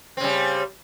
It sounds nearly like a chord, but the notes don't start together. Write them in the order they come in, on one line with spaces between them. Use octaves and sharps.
C4 C#3 G3